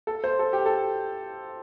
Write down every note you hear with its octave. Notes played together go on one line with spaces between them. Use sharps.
A4
C5
A4
G4
A4